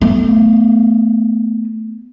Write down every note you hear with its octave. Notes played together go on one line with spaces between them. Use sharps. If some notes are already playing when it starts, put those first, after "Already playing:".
A3 B3